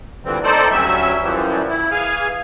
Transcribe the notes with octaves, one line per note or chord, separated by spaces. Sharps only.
A#2 D3 E3 G3 C4
A3 C4 D#4 A4 C5 D5
D2 F#3 G3 C#4 E5 E6
F#2 E3 F3 G3
E4
E3 G#4 F5 G#5 F6